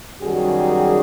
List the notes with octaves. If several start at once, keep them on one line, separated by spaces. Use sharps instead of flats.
F#2 D#3 G3 F#4 G#4